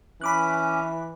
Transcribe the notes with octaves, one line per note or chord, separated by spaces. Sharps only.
E3 C#4 B5 D6 F#6